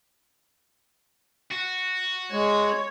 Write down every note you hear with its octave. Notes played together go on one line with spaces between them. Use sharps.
F#4
G#3 C#5